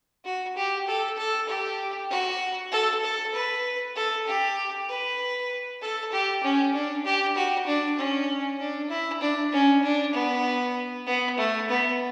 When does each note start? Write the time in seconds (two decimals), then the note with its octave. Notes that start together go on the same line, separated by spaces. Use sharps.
0.25 F#4
0.56 G4
0.87 A4
1.18 A4
1.49 G4
2.10 F#4
2.72 A4
3.04 A4
3.34 B4
3.96 A4
4.27 G4
4.89 B4
5.82 A4
6.12 G4
6.43 C#4
6.74 D4
7.05 G4
7.36 F#4
7.67 D4
7.98 C#4
8.59 D4
8.90 E4
9.21 D4
9.52 C#4
9.83 D4
10.13 B3
11.07 B3
11.38 A3
11.69 B3